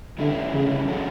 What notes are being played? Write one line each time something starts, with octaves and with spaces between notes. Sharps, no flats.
D3 E3 G3 C#4 E4
C#3 E3 G3 C#4 E4
D3 F#3 C#4 F#4 A4